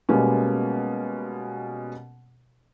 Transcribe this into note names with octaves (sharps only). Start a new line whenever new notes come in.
B2 G3 G#3 A#3 B3 C#4